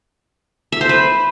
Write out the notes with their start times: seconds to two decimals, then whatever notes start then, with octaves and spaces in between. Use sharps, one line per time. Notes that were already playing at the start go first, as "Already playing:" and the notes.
0.72 E5
0.81 C5
0.89 B4